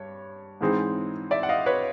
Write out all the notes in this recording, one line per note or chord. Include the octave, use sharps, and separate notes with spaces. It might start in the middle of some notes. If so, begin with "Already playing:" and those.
Already playing: G2 C#5
G#2 E3 G#3 C4 D#4
D5 E5
F#5
D#5 F5
B4 C#5